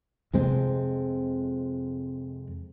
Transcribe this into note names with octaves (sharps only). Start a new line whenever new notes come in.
F2 C3 G#3 C4